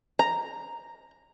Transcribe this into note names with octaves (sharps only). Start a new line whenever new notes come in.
A#5